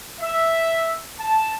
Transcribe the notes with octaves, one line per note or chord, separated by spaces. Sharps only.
E5
A5